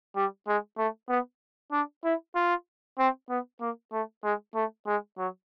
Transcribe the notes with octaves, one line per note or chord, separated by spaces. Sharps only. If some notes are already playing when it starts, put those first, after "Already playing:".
G3
G#3
A3
B3
D4
E4
F4
C4
B3
A#3
A3
G#3
A3
G#3
F#3